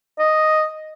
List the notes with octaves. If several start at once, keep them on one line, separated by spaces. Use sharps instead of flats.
D#5